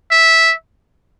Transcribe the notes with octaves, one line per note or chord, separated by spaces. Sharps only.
E5